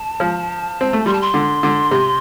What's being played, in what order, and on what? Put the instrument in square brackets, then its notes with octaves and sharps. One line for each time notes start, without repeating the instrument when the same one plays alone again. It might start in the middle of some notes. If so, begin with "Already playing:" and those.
Already playing: [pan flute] A5
[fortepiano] F3
C4
A3
[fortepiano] G3 [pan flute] C6
[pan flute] A5
C6
[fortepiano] D3
D3
C3